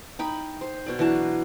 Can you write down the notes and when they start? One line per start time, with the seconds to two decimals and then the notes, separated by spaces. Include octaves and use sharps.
0.19 D#4 G5 B5
0.61 C5
0.86 B2 D5
0.99 E3 F#3 D4 A5